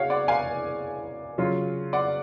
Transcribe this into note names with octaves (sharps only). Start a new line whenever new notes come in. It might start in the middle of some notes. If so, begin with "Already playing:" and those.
Already playing: C#3 F#4 G#4 C#5 F5
D5 F#5
F5 G#5
C#3 F#3 C#4 F4
D5 F#5